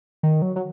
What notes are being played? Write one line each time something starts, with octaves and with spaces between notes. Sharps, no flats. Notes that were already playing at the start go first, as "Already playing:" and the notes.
D#3
F#3
F#3